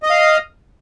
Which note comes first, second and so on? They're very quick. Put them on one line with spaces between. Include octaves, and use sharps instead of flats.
D#5 D#6 F5